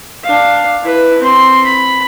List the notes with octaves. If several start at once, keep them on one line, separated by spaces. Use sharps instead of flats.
D4 F5
E4 B4
C4 C6
B5